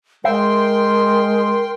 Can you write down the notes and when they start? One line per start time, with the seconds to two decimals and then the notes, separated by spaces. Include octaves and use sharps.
0.25 G#3 A#4 E5 G5 C6